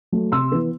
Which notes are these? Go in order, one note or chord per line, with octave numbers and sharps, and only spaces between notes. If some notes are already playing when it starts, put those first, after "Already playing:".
F#3 A3
C3 C6 E6
E3 B3